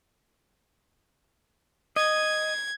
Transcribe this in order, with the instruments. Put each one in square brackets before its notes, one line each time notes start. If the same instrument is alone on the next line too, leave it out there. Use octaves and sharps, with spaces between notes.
[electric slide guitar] D#5 [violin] G#6